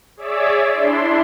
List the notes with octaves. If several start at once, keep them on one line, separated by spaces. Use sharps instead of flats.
G#4 C#5 D5 E5 D6 E6
D4 E4 C6